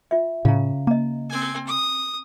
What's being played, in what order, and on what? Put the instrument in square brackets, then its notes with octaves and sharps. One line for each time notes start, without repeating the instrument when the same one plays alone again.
[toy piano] F4 E5
[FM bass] A2 [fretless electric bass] C#3 [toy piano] F5 A#5
[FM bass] A#3 [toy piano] D#5 A#5
[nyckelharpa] C4 G#5
D#6